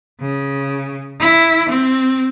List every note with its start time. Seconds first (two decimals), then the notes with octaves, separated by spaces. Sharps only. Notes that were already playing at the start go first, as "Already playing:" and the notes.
0.21 C#3
1.20 E4
1.70 C4